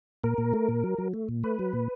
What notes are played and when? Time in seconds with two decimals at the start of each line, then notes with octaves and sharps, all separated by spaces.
0.24 A#2 A#4
0.38 A#2
0.53 A3
0.69 A#2
0.84 F#3
0.98 F#3
1.14 A3
1.29 A#2
1.44 A3 B4
1.59 F#3
1.73 A#2